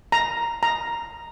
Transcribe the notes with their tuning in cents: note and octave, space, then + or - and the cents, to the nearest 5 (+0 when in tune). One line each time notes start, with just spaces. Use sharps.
A#5 +0
A#5 +0